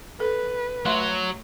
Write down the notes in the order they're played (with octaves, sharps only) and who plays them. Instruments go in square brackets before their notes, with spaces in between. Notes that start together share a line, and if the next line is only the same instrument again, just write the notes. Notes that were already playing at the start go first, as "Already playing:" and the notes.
[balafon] A4 [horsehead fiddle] B4
[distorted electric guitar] F#3 F#4 [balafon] A3 E5 C6